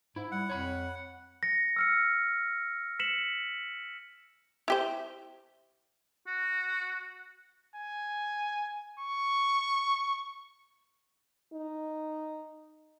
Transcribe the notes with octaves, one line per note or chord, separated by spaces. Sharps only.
G#2 E4
G3 F#5
F2 C#5 B5
A#6 C#7
E6 F6 C#7
B6 C#7 E7 F#7
E4 G4 C5
F#4
G#5
C#6
D#4